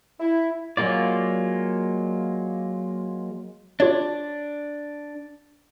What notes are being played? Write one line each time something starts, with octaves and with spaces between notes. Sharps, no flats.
E4
F#3 G#3 A#3 F4 D5
D4 F4 C#5